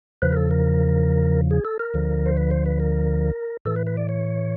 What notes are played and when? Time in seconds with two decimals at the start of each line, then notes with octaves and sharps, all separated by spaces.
0.22 E2 C#3 F3 B4
0.32 A#4
0.37 A4
0.51 A#4
1.51 G#4
1.65 A4
1.79 A#4
1.94 D2 D3 F3
2.26 C5
2.37 B4
2.51 C5
2.66 B4
2.80 A#4
3.65 A2 E3 A4
3.76 B4
3.87 B4
3.97 D5
4.09 C#5